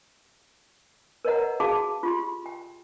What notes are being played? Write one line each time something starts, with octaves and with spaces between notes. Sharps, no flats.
A#4 B4 C#5 D#5 F#5 A#5
F#4 G#4 F5 A5 D6
F4 G4 C6
G5